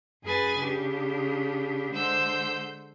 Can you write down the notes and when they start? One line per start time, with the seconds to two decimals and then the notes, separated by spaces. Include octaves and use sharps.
0.24 F#2 G#4 B4 G#5 A6
0.58 C#3 D4 G4
1.92 D3 G#3 C5 E6 G6